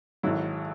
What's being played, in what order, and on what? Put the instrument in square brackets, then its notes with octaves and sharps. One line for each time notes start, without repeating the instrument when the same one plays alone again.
[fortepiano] G#1 G#2 F#3 E4